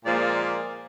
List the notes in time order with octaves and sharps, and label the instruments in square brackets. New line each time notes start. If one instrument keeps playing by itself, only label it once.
[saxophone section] A#2 F3 G#3 A#3 D5